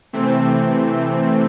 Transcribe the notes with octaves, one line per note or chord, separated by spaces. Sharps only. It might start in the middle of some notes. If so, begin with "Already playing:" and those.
C3 E3 A3 C4